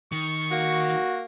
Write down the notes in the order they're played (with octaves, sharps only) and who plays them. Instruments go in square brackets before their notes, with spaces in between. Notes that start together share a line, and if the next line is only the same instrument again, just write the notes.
[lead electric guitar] D#3 [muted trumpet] C#6
[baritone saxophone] A#3 [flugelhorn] F#4